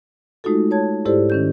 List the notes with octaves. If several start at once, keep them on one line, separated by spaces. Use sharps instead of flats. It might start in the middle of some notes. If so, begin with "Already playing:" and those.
G#3 A3 D#4 F4 F#4 A4
C#5 A5 G#6
G#2 E4 G4 A4 C5 D5
D#3 C#4 G6